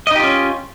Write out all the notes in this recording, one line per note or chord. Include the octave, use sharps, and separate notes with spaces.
C#4 D#4 F4 G4 D#5